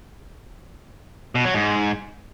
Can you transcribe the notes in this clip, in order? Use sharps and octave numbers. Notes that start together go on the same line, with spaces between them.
B2
F#3
G#2